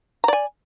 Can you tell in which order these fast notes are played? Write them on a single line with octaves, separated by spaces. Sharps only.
A#5 D5 G#5